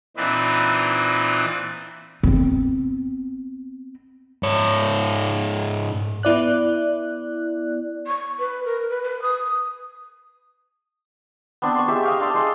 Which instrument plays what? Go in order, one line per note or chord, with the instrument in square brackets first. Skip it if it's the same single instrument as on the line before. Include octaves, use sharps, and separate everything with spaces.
[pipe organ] A#2 E3 C4 D4 D#4 B4
[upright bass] B3 C4
[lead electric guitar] G#2 C#5
[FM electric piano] B3 E4 D5 F#6
[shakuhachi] C#6
B4
A#4
B4
B4
D#6
[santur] B3 C4 D4
C6 C#6
G#3 G4 E5
D#5 F5 G5
D4 A4 C6 D6
G#3 C6